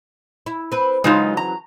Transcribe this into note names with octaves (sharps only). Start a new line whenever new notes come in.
E4
C4 B4
C#3 E3 F#3 G#3 D#4 F4
A#5